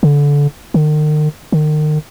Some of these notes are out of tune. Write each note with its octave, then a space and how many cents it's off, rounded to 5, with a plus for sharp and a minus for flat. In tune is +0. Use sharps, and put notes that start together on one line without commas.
D3 -25
D#3 -40
D#3 -35